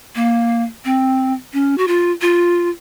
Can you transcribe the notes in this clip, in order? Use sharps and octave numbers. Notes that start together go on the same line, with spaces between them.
A#3
C4
C#4
F#4
F4
F4